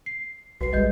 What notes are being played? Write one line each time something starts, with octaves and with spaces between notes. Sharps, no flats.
C7
C2 F#4 B4 C7
G#1 G3 G#3 D#5 G6